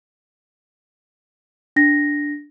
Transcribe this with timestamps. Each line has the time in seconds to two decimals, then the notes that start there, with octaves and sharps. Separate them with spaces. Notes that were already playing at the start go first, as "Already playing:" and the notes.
1.76 D4 A#6